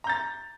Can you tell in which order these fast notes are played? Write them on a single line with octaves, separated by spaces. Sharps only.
A#5 G6 A6